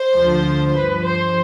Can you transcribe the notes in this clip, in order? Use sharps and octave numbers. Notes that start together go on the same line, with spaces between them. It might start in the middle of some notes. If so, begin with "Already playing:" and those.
Already playing: C5
D2 D3 F3
G2 F3 B4
C5